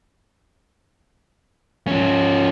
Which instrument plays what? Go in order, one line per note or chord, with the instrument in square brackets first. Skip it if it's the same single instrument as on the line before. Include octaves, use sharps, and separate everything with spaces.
[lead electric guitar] F3 C#4